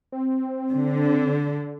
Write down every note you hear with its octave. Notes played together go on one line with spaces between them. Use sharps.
C4
D3